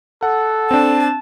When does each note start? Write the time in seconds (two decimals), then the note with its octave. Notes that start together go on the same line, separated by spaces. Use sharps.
0.23 A4 F#5
0.71 C4 D4 A5